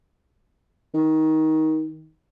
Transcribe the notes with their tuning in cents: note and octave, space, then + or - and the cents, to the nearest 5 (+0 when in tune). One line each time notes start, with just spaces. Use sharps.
D#3 +20